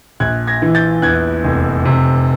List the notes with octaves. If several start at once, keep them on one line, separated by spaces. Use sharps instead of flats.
A#1 F#6 G#6
G#6 A#6
E3
G6 A6
E2 F#6 G#6
F1
C3